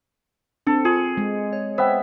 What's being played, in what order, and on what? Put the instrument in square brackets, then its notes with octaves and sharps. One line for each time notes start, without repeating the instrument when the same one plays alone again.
[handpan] C4 [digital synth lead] D4 [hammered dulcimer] A4
[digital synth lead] F4 [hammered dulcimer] G#4
[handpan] G#3
[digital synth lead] C#5
[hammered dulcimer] B3 E5 [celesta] C5 G5